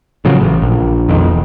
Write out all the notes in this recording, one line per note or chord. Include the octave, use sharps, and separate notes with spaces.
A2 C#3 F3 F#3
A1
A#1
F2 B2 D#3
E1